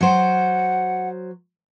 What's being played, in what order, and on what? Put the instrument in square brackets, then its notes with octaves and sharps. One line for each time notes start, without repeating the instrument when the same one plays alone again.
[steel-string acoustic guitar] F#3 C5 [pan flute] F#5